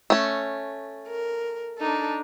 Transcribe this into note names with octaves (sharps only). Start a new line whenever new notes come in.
A3 C#4
A#4
D4 D#4 A4